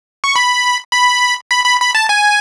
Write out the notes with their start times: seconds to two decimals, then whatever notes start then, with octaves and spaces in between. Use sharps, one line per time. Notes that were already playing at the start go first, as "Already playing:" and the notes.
0.24 C#6
0.36 B5
0.92 B5
1.51 B5
1.65 B5
1.81 B5
1.95 A5
2.09 G#5